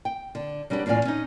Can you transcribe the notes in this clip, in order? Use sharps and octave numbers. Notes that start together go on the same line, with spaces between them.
G5
D3
F#3 G3 D4 G4 A#4 B4
E2 A2 C#4 F4 D5 G#5
C#4 D#4